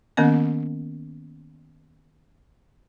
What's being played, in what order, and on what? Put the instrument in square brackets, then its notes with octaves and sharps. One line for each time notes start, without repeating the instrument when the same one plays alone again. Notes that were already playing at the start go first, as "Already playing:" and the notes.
[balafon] D#3 A#3 B3 C#4 D#5